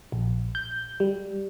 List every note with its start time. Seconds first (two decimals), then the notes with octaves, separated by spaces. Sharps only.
0.12 A#1
0.55 G6
1.00 G3